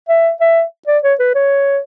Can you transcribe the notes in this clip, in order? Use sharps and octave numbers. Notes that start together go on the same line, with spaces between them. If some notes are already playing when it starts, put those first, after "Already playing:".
E5
E5
D5
C#5
B4
C#5